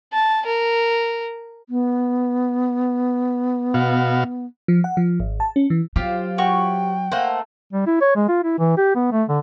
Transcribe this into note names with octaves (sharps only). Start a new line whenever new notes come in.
A5
A#4
B3
B2 F#4 F5
F3
F#5
F3
G#1
A5
C#4
E3
F#3 F4 G4 C5
F#4 C#5 G5 C#6
A3 A#3 C5 F#5
G3
E4
C#5
G#3
F4
E4
E3
G4
B3
A3
D3